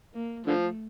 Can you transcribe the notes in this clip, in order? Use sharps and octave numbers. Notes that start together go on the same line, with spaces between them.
A#3
D3 F3 A3